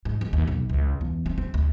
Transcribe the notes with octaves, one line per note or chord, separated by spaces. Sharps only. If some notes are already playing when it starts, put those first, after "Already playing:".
G#2
F2
D#2
B1
C#2
E2
C4
C4
D2